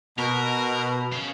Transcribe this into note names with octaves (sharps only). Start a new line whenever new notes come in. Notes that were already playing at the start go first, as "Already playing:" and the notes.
B2 A#4
C#4 F5